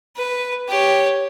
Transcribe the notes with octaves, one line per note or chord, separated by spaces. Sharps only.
B4
G4 C#5